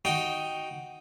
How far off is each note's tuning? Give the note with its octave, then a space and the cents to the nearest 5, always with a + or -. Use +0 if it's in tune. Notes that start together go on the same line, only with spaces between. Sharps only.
D#4 +0 F#4 +0 G5 +0